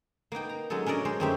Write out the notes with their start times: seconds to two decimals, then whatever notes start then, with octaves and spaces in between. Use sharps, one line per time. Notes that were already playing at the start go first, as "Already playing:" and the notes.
0.32 A#3 B3 D#4 G5
0.49 A#5
0.70 F#3 G#3 C#4 D#4 A4
0.86 C#4 D4 A#4 D5 D#5
1.05 G#3 C#4 C5
1.20 F#2 A3 C4 D#4 G4 E5